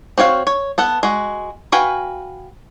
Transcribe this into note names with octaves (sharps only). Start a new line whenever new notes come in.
C4 F#4 C#5 F5
C#5
B3 A4 F#5
G#3 F#4
F#4 B4 F5 G5 G#5